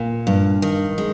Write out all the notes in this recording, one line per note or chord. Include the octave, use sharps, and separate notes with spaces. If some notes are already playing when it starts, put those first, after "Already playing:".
Already playing: A#2
G2
D#3
G#3